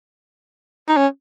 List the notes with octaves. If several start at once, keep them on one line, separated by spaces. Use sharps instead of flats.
D#4
C#4